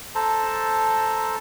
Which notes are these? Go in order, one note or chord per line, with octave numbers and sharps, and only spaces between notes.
A4 C5 A5 A#5